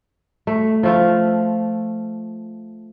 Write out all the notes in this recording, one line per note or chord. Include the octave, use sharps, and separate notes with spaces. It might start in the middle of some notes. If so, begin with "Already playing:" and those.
A3
F3 A3 F4